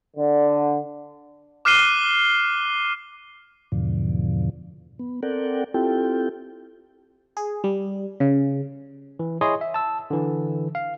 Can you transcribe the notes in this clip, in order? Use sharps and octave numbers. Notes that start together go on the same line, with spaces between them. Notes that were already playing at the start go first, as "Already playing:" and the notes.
D3
D6 F6 F#6 C7 D#7 G7
E2 G#2 B2 D3 F3
B3
C4 A4 A#4 D5 F#5 G5
C4 E4 F4 G4 A4 G5
G#4
G3
C#3
E3
E4 G#4 C#5 D#5 C6 D#6
E5
A5 E6
D3 E3
F5